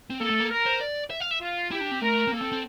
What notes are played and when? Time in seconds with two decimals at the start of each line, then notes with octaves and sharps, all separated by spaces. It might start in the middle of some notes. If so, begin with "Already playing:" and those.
0.10 C4
0.21 A#3 A4
0.30 A3
0.40 A#3
0.50 A#4
0.66 C5
0.81 D5
1.10 E5
1.20 F5
1.31 E5
1.41 F4
1.71 E4 G4
1.81 D4
1.91 C4
2.01 A3 A#4
2.27 C4
2.32 A#3 A4
2.42 C4
2.52 C4